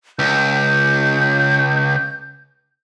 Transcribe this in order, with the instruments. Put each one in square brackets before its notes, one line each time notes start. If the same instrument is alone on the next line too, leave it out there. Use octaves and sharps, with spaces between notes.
[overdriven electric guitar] C#2 [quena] G6